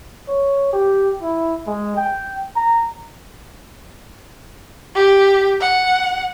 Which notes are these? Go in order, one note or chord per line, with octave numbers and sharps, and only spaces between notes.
C#5
G4
E4
G#3
G5
A#5
G4
F#5